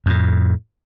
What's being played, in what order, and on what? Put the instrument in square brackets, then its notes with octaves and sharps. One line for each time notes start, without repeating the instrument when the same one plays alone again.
[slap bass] F2 A2